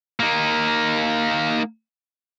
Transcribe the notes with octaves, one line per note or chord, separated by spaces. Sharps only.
A#3 D#4